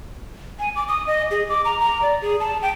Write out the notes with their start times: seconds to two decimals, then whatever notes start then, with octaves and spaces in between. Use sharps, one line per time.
0.59 G#5
0.76 D6
0.88 D#6
1.07 D#5
1.31 G#4
1.49 D6
1.65 A#5
1.80 A#5
2.02 D5
2.22 G#4
2.40 A5
2.62 G5